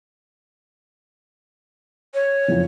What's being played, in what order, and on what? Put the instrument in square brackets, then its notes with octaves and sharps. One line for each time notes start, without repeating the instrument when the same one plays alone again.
[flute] C#5
[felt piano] F#1 F2 F3